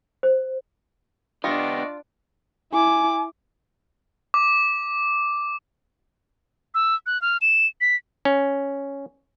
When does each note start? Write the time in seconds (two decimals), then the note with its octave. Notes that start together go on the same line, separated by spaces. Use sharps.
0.23 C5
1.44 B3 D4 F4 G4 D5 D#5 C#6 A#6
2.73 E4 G#5 D6
4.34 D6
6.75 E6
7.06 F#6
7.22 F6
7.42 E7
7.81 B6
8.25 C#4